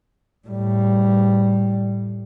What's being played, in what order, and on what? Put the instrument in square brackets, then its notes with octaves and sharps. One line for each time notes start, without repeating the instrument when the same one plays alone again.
[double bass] A2 G3